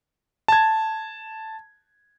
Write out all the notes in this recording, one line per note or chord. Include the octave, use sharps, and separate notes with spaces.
A5 G#6